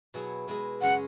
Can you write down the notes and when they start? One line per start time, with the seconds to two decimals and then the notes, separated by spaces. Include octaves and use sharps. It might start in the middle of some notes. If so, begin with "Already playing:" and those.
0.14 B2 F#3 E4 G#4
0.48 B2 G#3 E4 G#4
0.81 F#2 C#3 G#3 C#4 F#5